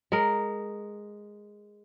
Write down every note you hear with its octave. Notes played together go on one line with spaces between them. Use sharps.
G#3 A#4